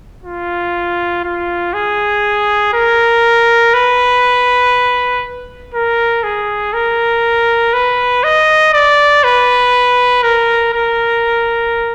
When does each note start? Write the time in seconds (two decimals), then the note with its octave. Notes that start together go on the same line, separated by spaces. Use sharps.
0.24 F4
1.24 F4
1.74 G#4
2.74 A#4
3.74 B4
5.74 A#4
6.23 G#4
6.74 A#4
7.74 B4
8.24 D#5
8.73 D5
9.24 B4
10.23 A#4
10.73 A#4